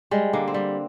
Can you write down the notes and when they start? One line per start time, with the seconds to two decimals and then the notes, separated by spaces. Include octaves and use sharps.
0.11 G3 G#3
0.33 D3 A#3
0.48 C4
0.54 G3